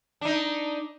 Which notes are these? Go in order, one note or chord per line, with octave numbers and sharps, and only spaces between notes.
D4 D#4